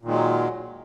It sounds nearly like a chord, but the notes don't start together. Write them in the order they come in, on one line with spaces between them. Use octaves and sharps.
A#2 D#3 G#3 F#3